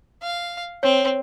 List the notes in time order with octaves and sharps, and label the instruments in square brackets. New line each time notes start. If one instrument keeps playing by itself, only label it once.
[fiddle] F5
[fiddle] C4 [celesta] C#5